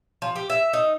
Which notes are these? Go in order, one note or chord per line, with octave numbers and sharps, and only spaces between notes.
F3
G4
E5
D#4